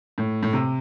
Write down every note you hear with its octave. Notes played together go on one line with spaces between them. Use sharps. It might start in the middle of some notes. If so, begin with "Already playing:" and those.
A2
A2
C3